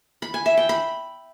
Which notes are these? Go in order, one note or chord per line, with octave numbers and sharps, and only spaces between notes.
B5
G#5
E5
G5
B5